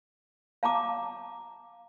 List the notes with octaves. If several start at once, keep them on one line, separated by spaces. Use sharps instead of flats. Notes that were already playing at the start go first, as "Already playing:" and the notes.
F5 A5 A#5 D6